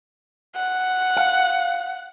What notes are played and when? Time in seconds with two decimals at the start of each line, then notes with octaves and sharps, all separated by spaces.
0.56 F#5
1.17 F5